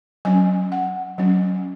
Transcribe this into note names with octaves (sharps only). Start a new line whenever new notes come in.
F#3 C#4 G#5
F#5
F#3 C#4